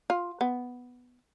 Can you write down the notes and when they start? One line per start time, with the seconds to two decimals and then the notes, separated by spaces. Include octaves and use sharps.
0.10 F4
0.41 B3